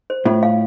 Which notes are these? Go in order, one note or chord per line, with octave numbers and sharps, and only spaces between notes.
C5
A2 F4
F5